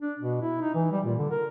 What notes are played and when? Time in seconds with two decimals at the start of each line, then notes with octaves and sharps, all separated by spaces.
0.02 D4
0.19 B2
0.42 E4
0.62 D#4
0.75 E3
0.92 G3
1.05 A#2
1.19 D3
1.31 A#4